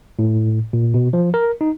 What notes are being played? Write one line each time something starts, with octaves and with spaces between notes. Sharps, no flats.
A2
A#2
B2
F3
A#4
D#4